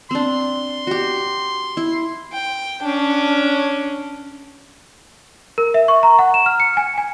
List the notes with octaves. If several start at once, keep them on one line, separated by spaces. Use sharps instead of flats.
C4 D4 C6
F#4 G4
E4
G5
C#4 D4
A#4
E5
C#6
A#5
F#5
E7
F6
C#7
G#5
G#5